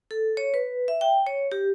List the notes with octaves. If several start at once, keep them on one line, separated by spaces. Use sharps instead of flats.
A4
C#5
B4
E5
G5
C#5
G4